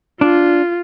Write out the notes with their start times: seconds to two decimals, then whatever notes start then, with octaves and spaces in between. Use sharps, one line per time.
0.21 D4 F4